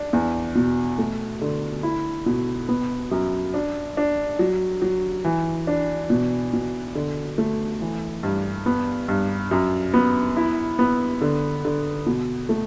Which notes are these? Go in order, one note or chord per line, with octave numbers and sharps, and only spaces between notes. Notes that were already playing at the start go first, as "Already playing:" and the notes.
Already playing: D4
E2
B2
A3
D3
E4
B2
B3
F#2
D4
D4
F#3
F#3
E3
D4
B2
B2
D3
A3
E3
G2
B3
G2
F#2
B3
E4
B3
D3
D3
B2
A3